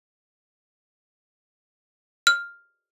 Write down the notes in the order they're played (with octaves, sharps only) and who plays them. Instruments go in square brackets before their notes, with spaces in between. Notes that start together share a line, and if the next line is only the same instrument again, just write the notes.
[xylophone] F6